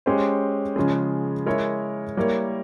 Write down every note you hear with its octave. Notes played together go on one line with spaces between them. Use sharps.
G#3 C#4 G4 C5
C#3 F3 G#3
G#3 E4 A#4 C#5
G3 A#3 E4 A#4 C#5